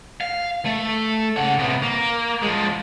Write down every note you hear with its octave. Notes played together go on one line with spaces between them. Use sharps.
F5
A3
C#3 F#5
C3 B3
A#3
F3 G#3